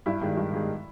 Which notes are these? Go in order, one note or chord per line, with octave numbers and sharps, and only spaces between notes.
G2 E4
D#3 G#3
G2
D#3 G#3